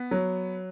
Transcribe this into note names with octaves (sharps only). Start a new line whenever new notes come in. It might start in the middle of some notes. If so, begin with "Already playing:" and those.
Already playing: B3
F#3